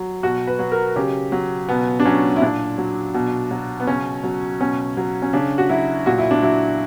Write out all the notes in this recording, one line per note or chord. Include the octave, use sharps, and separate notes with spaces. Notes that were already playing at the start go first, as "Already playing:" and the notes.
Already playing: F#3
B2 F#4
B4
F#3
A#4
C#3 G4
F#3
B2 B3
D4
F#3 C#4
E4
A#2 D4
F#3
B2
F#3
B3
C#3 C#4
F#3
B2 C#4
F#3
C#4
C#3 D4
F#4
F#3 E4
A#2 F#4
E4
D4
F#3 E4